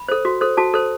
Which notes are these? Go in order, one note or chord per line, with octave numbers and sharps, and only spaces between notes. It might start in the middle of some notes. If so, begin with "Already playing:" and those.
Already playing: B5
A4 C5
F#4
A4 C5
F#4 A5
A4 C5